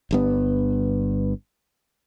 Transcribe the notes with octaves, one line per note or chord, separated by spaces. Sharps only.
G1 G2 B3